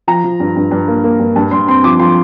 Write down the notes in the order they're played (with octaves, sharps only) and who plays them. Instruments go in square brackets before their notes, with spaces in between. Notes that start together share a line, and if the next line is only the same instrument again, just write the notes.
[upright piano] F3 A#5
F3
G2
G2
G2
A#3
A#3
G2
G2 A5
G2 C6
C4 C6
F3 D6
F3 C6